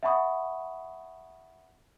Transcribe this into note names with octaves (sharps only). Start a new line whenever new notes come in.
E5 F#5 A5 B5 C#6 D#6